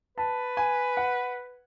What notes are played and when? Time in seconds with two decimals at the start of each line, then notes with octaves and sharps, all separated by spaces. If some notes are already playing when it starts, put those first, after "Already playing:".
0.18 B4 A5
0.57 G#5
0.97 F#5